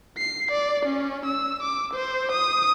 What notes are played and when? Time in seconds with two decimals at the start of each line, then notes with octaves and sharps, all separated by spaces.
0.17 C7
0.51 D5
0.86 C#4
1.26 E6
1.62 D6
1.94 C5
2.32 D#6